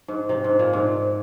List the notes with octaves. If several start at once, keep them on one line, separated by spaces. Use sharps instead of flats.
G#2
C3
G#2
A#2
G#2